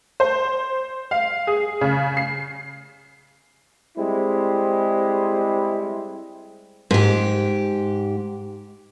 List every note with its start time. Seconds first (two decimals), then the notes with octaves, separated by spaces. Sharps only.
0.20 C5
1.11 F5
1.47 G#4
1.81 C#3
2.17 C7
3.97 G3 G#3 C4 E4
6.91 G#2 G4